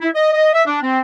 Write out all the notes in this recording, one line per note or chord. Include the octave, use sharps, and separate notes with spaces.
E4
D#5
D#5
E5
D4
C4